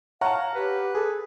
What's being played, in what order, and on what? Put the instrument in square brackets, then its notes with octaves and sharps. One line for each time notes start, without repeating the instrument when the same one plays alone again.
[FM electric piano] C#5 A#5 F6 [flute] F5 [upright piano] F#5 A5
[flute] G4 [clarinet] B4
[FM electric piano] G#4 A4